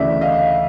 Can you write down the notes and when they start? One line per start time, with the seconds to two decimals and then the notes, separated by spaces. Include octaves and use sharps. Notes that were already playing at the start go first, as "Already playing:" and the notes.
Already playing: D2 C#3 E3 D5 E5
0.21 D#5 F5